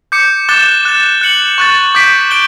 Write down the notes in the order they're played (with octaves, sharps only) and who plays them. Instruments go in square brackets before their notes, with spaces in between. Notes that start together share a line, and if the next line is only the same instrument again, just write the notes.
[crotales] D6 G6 C#7
D6 F#6 A6 E7 G7
F#6 A6 E7
F#6 C#7 F#7
C#6 F#6 A6
D6 G6 B6 D7
G6 D7 G7